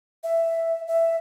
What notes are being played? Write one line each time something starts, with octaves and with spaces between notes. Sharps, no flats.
E5
E5